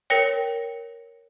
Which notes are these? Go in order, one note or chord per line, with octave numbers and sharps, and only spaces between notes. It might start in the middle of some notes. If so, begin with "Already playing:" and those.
A#4 C#5 G5 A#6 C#7